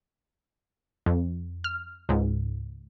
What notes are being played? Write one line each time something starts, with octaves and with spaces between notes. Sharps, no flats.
F2
F6
C#2 G#2